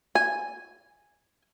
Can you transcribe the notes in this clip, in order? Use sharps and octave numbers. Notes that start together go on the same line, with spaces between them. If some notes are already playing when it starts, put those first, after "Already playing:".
G#5